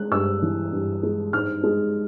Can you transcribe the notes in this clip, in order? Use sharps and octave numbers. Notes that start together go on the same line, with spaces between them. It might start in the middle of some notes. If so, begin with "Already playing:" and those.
Already playing: G#3 F#6
G2 E6
E3
G2
G#3
G#2 F6
G#3